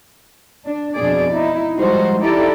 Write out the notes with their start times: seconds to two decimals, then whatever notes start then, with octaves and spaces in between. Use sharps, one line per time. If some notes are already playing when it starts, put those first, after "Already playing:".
0.65 D4
0.96 F2 B2 B3 D4 G#4 D5
1.33 D#4 E4
1.77 F3 G3 G#3 D#4 F#4 C5
2.21 D#4 E4 G4 A4 D5